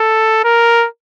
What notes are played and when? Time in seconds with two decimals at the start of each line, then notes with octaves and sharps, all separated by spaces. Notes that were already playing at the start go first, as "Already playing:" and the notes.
Already playing: A4
0.44 A#4